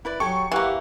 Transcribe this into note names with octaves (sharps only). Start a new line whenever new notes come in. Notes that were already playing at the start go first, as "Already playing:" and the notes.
E4 B4 D5
F#3 G4 A4 G#5 C#6
E3 A#3 G4 E5 F#5